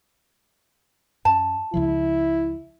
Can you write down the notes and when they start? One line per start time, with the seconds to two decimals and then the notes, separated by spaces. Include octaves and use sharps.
1.25 F#2 A5
1.74 C#2 C#3 F3 E4